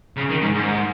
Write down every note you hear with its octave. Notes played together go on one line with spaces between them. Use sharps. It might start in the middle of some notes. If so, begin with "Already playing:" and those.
C#3
D#3
G#2
G#2